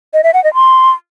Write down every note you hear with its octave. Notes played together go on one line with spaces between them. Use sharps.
D#5
E5
F#5
D#5
C6